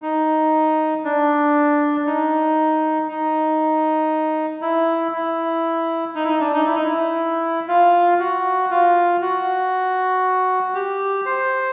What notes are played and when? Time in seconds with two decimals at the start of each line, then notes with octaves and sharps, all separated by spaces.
0.02 D#4
1.05 D4
2.06 D#4
3.08 D#4
4.62 E4
5.13 E4
6.15 D#4
6.24 E4
6.28 D#4
6.41 D4
6.54 D#4
6.66 E4
6.75 D#4
6.84 E4
7.68 F4
8.19 F#4
8.71 F4
9.21 F#4
10.75 G4
11.26 C5